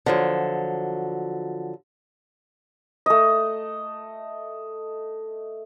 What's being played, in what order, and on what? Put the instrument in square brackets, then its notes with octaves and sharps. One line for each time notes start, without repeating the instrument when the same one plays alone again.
[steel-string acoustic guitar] D3 F3 F#3
[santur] A3 D#5